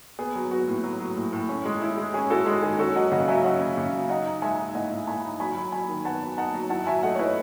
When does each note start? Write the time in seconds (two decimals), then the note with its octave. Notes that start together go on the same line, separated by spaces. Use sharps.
0.19 B3 G#4
0.35 F#3
0.51 B3 F#4
0.68 A2
0.83 F#3
1.00 F#3
1.17 A2
1.33 A2
1.49 C#4
1.65 G#3
1.81 E4
1.98 G#3
2.14 C#4 G#4
2.30 E4 F#4 A4
2.46 G#3 F#4
2.63 D#3 G#4
2.79 C#4 F#4 A4
2.95 F#3 D#5 F#5
3.12 C#3 D#5 F#5
3.28 F#3 E5 G#5
3.44 C#4 D#5 F#5
3.61 C#3
3.77 C#3
3.93 F#3
4.09 D#4 D#5 F#5
4.26 D#4
4.42 G#3 E5 G#5
4.58 D#4
4.75 A2 D#5 F#5
4.91 A2
5.07 A2 G#5 B5
5.24 D#4
5.40 F#3 G#5 B5
5.56 F#3
5.72 F#3 G#5 B5
5.89 D#3
6.05 B3 F#5 A5
6.22 F#3
6.38 D#4 F#5 A5
6.54 F#3
6.70 E4 F#5 A5
6.87 F#3 E5 G#5
7.03 A3 D#5 F#5
7.15 C#5
7.19 E4 B4 D#5